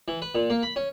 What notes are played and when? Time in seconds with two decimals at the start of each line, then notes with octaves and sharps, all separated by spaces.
0.08 E3
0.22 B4
0.35 A#2
0.50 A#3
0.63 B5
0.76 C#4